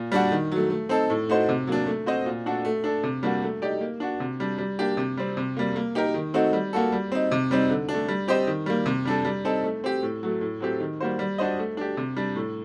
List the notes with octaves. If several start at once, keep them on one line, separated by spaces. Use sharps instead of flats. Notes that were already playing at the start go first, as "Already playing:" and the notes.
Already playing: A#2
G3 D4 F#4
D#3
F#3 A3
A3
C4 D#4 A4
A2
A3 D#4 F#4 C5
C3
F#3 A#3 D4
A3
C4 F#4 C5 D#5
A#2
A3 D4 F#4 A4
A3
D4 A4
C3
G3 A#3 D4 F#4
A3
D#4 G4 D5
A#3
D4 F#4
C3
G3 D4
G3
A#3 D4 G4
C3
G3 C4
C3
G3 A#3
A#3
D#4 G4 A#4
D#3
A3 C4 D#4 F#4
G3
A#3 F#4 A4
G3
C4 D#4
C3
G3 C4 D#4
D3
D4
A3
G3
C4 G4 C5 D#5
D#3
G3 A#3
C3
G3 D4 A4
G3
C4 D#4 A4
A3
C4 G4
A2
F#3 A3
A2
F#3 A3 C4 G4
D#3
G3 A#3 F#4 C5
G3
D4 F#4 C5 D#5
A3
D4 G4
C3
G3 D4
A2